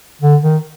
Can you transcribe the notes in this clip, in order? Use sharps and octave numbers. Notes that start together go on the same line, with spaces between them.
D3
D#3